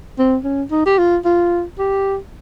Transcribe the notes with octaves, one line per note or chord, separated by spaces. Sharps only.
C4
C#4
D#4
G4
F4
F4
G4